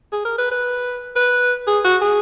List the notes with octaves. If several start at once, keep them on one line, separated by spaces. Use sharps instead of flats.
G#4
A#4
B4
B4
B4
G#4
F#4
G#4